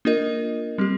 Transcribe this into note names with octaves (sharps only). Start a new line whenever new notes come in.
A#3 D4 F4 A#4 D#5
G3 C4 G4